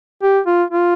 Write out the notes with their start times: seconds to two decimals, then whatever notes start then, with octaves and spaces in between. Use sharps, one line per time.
0.23 G4
0.47 F4
0.71 F4